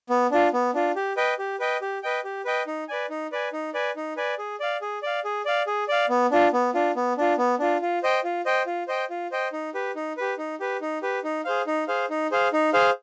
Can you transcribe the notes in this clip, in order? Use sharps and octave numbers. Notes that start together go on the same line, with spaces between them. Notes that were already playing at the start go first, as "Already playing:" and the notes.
B3
D4 F4
B3
D4 F4
G4
B4 D#5 G5
G4
B4 D#5 G5
G4
B4 D#5 G5
G4
B4 D#5 G5
D#4
B4 D5 G#5
D#4
B4 D5 G#5
D#4
B4 D5 G#5
D#4
B4 D5 G#5
G#4
D5 F5
G#4
D5 F5
G#4
D5 F5
G#4
D5 F5
B3
D4 F4
B3
D4 F4
B3
D4 F4
B3
D4 F4
F4
C5 D#5 G5
F4
C5 D#5 G5
F4
C5 D#5 G5
F4
C5 D#5 G5
D#4
G4 B4
D#4
G4 B4
D#4
G4 B4
D#4
G4 B4
D#4
G#4 C5 F5
D#4
G#4 C5 F5
D#4
G#4 C5 F5
D#4
G#4 C5 F5